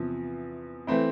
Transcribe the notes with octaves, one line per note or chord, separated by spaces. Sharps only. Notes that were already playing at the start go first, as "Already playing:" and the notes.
Already playing: E2 C3 F3
E3 A3 C4 E4